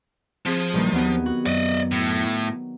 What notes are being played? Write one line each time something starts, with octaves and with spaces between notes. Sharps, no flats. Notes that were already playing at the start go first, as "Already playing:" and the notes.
F3 C4 G#4
A#1 G2 D#3 E3 G3 A#3
D#2 F#3 B3
F#4
F#2 F#4 D5 D#5
A2